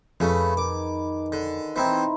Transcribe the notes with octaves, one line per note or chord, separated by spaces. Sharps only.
F2 C#3 A3 G#4 B4
D#3 D6
D3
E3 C4 D#4 E4 C5